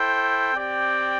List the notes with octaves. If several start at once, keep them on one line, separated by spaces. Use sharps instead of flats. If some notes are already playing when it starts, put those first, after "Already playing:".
Already playing: E4 A4 C5 G5
C4 G4 D5 G5